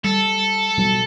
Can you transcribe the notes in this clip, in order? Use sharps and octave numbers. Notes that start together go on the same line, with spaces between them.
G3 A4
B2 F#3 G3